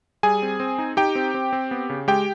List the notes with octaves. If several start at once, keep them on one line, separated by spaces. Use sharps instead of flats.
G3 G#4 G#5
C4
C4
D#4
D#4 G4 G5
C4
C4
C4
B3
C#3
G#3 G4 G5